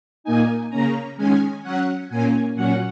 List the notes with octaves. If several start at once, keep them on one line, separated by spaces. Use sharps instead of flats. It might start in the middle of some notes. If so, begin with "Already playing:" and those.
A#2 A#3 D#4 G#5
C#3 A#3 C#4 A#5
D#3 G#3 C#4 G#5
F#3 C#4 F#5
A#2 A#3 C#4 G#5
A#2 F#3 C#4 F#5